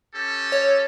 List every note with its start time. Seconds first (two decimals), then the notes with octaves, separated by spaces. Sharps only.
0.14 C#4 G4 A4
0.52 C#5